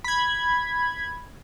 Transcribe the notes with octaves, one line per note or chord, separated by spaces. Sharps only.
B5 G#6